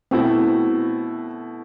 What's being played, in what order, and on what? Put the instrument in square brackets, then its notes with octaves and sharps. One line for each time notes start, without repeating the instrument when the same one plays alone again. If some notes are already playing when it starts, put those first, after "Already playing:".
[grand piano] B2 A3 E4 [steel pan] C4